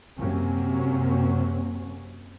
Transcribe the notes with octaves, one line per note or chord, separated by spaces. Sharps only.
F#2 C3 F#3 A#3 C4 C#4